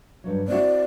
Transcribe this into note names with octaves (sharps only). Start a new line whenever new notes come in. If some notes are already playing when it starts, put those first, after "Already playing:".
G2 C#3 F#3
C4 E4 F#4 D5